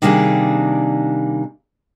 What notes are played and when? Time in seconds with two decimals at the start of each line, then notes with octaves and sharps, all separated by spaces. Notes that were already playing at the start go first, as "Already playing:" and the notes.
0.02 C3 D#3 G3 A#3 D4 G#4